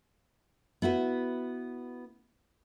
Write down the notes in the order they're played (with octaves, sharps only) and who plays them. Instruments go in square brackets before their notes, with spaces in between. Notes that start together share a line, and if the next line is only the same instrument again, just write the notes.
[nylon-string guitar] B3 E4 F#4 B4